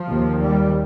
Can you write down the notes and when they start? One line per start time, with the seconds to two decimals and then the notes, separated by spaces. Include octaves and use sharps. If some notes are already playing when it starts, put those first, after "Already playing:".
Already playing: F3
0.09 D#2
0.41 G3